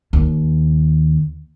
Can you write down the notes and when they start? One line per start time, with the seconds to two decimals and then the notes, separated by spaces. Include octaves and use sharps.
0.13 D#2